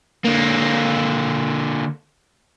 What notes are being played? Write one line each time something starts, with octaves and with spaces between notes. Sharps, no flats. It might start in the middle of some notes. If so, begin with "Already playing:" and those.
D3 A#3